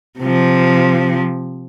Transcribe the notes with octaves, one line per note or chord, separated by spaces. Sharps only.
C3 F3